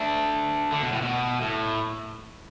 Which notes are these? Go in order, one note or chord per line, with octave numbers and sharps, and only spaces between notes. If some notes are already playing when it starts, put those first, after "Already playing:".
Already playing: A3 D4
D3
B2
A2
B2
A2